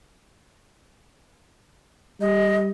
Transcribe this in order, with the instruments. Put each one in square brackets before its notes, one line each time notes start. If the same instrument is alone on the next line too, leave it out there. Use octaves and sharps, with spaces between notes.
[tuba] G3 [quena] D#5